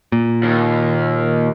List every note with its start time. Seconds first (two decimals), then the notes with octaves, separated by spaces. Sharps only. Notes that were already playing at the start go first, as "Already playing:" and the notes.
0.12 A#2
0.43 D#2